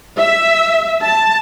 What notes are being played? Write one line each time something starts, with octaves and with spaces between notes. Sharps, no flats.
E5
A5